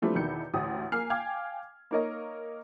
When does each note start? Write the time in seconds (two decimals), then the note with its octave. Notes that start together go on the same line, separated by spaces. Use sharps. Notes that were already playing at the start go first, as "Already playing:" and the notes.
0.02 E3 F3 G3 A3 C4 D4
0.15 E2 B2 D#3 E4 G6 C#7
0.54 A1 D2 G5 D#6
0.92 A#3 G#5 F6 C7
1.10 F5 G5 G#5 D6 F6 G#6
1.91 A#3 D#4 A#4 C#5 D#5